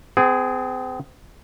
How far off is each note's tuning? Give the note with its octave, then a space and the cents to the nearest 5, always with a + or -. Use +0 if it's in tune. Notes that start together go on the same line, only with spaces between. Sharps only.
C4 -40 G#4 +0